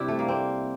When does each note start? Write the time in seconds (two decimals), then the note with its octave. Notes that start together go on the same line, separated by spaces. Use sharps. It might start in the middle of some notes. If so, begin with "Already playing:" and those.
Already playing: C3 G3 C4 D4 E4 G4
0.08 A3
0.19 A#3
0.28 C4